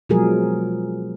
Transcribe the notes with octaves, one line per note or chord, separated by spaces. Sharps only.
B2 F3 F#3 G#3 G#4 A#4